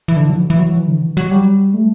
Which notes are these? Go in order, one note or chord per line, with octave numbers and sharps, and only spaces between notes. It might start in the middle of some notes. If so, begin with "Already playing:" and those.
E3
D3
F#3
E3
F#3
E3
F#3
E3
D3
E3
F#3
G3
A3